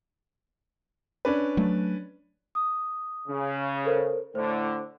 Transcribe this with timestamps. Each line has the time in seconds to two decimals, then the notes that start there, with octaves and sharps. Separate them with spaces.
1.25 C#4 D4 B4
1.57 F#3 A3
2.55 D#6
3.28 C#3
3.85 A4 A#4 C5
4.35 A2 D3 C5